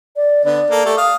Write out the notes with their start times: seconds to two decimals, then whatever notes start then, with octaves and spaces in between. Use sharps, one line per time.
0.16 D5
0.45 D3 B3 D5
0.70 A#3 A4
0.85 A3 G4 A4
0.97 F5 D#6